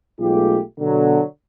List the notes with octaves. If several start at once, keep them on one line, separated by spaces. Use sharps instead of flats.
B1 G#3 A3 F4 G4
B2 D3 F#3